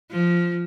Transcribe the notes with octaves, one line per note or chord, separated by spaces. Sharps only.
F3